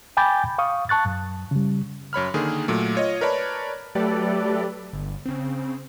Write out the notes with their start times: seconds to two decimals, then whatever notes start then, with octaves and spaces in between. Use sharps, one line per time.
0.17 G5 G#5 B5 D6 G6 A6
0.58 F5 C#6 D#6
0.89 A5 C#6 F#6 A6
1.06 F#2
1.51 C#3 G3
2.13 F#2 C#5 B5 F6
2.34 D3 D#3 A#3 G#4
2.68 A#2 F#3 A3
2.95 F4 C#5 D#5
3.21 A#4 B4 C#5 D5 A5 B5
3.95 F#3 A3 G4 A4 B4 D5
4.93 G1
5.26 C#3 C4